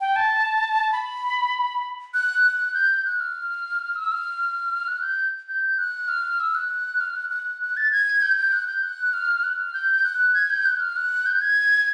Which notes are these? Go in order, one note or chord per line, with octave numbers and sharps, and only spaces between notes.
G5
A5
B5
F#6
F#6
G6
F#6
F6
E6
F6
F#6
G6
G6
F#6
F6
E6
F#6
F6
F#6
F#6
F#6
A6
G#6
G6
G6
F#6
G6
F#6
F6
F#6
F6
G6
F#6
G#6
G6
F#6
F6
F#6
G6
G#6